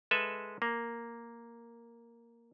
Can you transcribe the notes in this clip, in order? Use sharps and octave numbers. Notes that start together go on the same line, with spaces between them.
G#3 A4 B4 E5
A#3